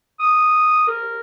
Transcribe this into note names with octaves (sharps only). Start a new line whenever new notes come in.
D#6
A#4